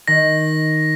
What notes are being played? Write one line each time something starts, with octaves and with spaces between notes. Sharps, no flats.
D#3 A#6